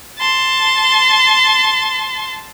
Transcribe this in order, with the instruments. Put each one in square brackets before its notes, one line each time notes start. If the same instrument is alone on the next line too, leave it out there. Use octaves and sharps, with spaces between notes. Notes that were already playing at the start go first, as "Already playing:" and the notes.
[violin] A5 C6